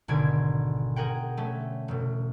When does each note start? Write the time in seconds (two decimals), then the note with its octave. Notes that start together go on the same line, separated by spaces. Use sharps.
0.08 G#1 B2 D3 G#6 D7
0.96 G#4 A#4 F#5 G5
1.37 A3 C#4
1.88 E1 B2